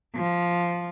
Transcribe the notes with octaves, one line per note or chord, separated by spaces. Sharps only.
F3